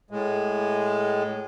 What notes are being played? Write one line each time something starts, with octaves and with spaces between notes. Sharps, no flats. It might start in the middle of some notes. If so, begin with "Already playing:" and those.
A2 G#3